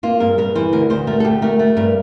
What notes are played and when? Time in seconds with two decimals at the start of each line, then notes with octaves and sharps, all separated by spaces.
0.03 A#3 F4
0.20 G2 A#4
0.38 G2 A#4
0.55 E3 C5
0.73 D2 A#4
0.90 D2 C5
1.07 A3 A#4
1.20 A4
1.25 D2 G4
1.42 A3 A#4
1.59 A3
1.77 G2 A#4